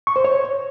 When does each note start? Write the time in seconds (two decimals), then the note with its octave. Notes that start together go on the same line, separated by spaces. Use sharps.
0.07 C#6
0.16 C5
0.25 C#5